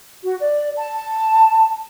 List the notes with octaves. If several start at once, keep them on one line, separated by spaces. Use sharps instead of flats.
F#4
D5
A5